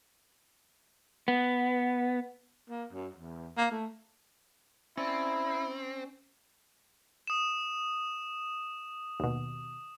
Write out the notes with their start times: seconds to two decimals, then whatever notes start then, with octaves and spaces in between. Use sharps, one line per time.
1.28 B3
2.69 A#3
2.92 F#2
3.14 E2
3.57 A#3
3.71 A3
4.97 C4 C#4 E4 D5
7.27 D#6 E7
9.20 D#2 B2